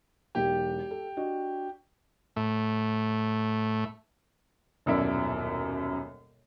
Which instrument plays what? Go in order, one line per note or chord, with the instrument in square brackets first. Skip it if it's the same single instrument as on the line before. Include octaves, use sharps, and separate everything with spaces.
[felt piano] E1 B1 [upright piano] G4
[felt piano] A4
D4 F#4 D#5
[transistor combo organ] A2 A3
[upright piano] D#1 F#2 B2 E4 D5 E5